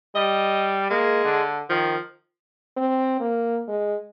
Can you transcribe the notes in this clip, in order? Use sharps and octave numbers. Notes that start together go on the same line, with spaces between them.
G3 D#5
G#3 A#3
D3
D#3 F3
C4
A#3
G#3